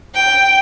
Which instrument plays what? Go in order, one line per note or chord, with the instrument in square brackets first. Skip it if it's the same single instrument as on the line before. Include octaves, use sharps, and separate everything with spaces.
[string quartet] G5